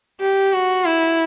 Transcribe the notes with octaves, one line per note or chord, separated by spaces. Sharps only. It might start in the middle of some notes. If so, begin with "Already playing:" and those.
G4
F#4
E4